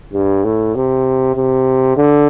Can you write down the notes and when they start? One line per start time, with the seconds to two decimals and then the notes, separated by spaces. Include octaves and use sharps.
0.13 G2
0.44 A2
0.75 C3
1.36 C3
1.97 D3